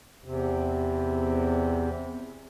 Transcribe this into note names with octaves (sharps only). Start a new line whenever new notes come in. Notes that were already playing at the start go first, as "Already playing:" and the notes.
E2 C3